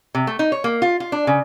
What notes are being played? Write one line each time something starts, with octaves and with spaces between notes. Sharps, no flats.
C3
A3
D#4
C#5
A#3
F4
F4
D4
C#3